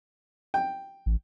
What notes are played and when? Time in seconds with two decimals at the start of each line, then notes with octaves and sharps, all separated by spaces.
0.54 G5
1.06 A1